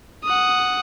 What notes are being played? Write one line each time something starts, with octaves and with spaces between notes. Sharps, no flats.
F#5 D#6